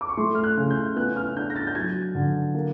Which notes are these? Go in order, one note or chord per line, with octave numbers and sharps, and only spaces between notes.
D6
C#6
A3 C6
F6
F#6
C#3
G6
B3 F#6
F6
D4 G6
A#6
A6
G6
F#3 G#6
D3
A#3